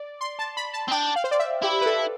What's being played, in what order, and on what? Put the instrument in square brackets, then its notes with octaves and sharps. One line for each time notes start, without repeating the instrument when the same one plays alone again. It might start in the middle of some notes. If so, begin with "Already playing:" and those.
Already playing: [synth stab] D5
C6
A5
B5
A5
[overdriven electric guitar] C4
[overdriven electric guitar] D4 [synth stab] G5
[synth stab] F5
C5
D5
E5
[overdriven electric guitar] E4 [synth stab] G4
[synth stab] B4
A4